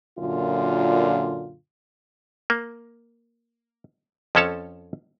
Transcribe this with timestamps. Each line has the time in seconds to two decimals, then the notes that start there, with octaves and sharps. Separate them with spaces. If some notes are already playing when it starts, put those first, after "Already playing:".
0.18 F#2 A#2 D3 F4
2.50 A#3
4.35 F2 F3 C#4 A4 C#5 A5